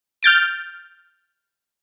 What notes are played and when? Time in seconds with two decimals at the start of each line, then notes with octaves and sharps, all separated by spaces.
0.23 F6 G6 A6 D7